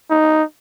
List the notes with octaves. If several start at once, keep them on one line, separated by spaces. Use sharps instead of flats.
D#4